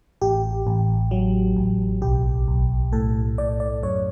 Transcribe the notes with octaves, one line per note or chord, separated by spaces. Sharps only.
A1 G4
A1
F#3
A1
B1 G4
B1
A2 A4
A2 D5
D5
F#2 C#5